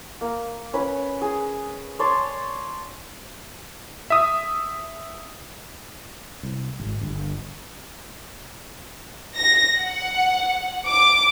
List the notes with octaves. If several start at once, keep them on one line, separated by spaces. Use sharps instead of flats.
A#3
C#4 B4 B5
G#4
C#5 D5 A5 C6
E5 D#6
C2
G#1
G1
A#6
F#5
D6